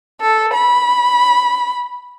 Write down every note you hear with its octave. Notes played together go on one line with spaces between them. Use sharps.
A4
B5